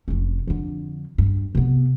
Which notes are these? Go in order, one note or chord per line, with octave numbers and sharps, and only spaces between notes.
F1 C#4
F2 D3
G2
C3 B3